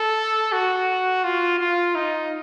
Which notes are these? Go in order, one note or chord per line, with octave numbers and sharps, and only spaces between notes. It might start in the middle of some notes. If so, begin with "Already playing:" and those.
Already playing: A4
F#4
F4
F4
D#4